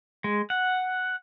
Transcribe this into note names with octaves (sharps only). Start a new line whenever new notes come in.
G#3
F#5